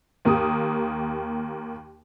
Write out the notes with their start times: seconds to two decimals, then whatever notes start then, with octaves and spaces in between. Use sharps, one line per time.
0.25 D#2 A#3 G4 D#6